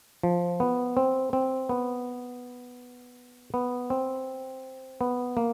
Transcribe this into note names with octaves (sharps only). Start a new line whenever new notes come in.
F3
B3
C4
C4
B3
B3
C4
B3
A#3